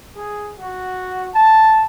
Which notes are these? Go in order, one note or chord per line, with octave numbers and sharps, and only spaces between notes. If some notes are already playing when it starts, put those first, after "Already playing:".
G#4
F#4
A5